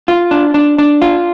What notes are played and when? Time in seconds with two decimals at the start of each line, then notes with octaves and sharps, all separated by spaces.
0.08 F4
0.31 D4
0.54 D4
0.78 D4
1.02 F4